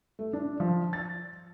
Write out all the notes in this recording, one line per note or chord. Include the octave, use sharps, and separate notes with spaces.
A3
D4
F3
A6